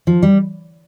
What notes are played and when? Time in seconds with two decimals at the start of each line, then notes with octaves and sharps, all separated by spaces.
0.07 F3
0.23 G3